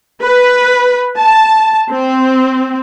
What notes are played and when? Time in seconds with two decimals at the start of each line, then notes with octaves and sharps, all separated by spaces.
0.21 B4
1.17 A5
1.91 C4